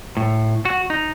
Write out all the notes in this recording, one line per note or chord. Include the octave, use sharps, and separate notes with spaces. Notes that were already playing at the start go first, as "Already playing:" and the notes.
A2
F#4
D#4